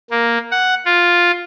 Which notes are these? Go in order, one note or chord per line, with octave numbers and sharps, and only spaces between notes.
A#3
F#5
F4